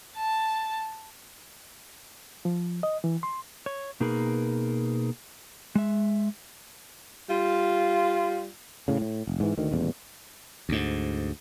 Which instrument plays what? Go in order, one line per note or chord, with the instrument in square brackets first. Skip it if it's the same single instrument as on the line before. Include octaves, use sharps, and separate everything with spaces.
[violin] A5
[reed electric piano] F3
D#5
E3
C6
[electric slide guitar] C#5
B2 A#3 D#4 G#4 A#4 B4
G#3 E5
[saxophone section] G3 F4
[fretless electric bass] A2 C#3
A2
F1
G#2 E3
D2 D#3
D#1 A1 E2
[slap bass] D2 G#2